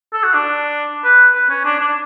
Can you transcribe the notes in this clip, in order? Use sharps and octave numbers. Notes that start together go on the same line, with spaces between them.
A4
F#4
D4
B4
B4
C#4
D4
D4